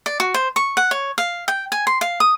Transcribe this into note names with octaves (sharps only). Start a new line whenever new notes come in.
D5
F#4
C5
C#6
F#5
C#5
F5
G5
G#5
C6
F5
D#6